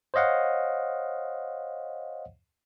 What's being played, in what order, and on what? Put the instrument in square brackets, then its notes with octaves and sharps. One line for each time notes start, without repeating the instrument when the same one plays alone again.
[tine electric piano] C5 C#5 D#5 F5 F#5